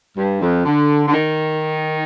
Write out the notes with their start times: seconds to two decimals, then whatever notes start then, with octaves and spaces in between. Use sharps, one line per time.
0.17 G2
0.41 F2
0.65 D3
1.08 D3
1.14 D#3